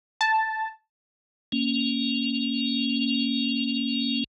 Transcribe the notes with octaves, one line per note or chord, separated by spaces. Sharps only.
A5
A#3 C#4